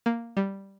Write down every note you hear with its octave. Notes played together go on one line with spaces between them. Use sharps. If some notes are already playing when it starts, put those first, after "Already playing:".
A#3
G3